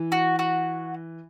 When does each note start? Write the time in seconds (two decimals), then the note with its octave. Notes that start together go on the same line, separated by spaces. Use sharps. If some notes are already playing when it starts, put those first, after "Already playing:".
Already playing: E3
0.12 F#4
0.39 F#4